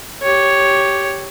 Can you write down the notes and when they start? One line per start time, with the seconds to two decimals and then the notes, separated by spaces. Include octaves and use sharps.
0.23 G4 C#5